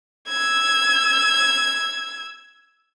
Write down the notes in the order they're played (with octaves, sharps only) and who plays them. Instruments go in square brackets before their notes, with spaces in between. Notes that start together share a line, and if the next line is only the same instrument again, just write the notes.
[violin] E6 G#6